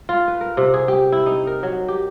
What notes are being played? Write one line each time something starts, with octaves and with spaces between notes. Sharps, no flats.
F4
B4
A#4
C3
G#4
G4
E4
D#4
A#4
F#3
G4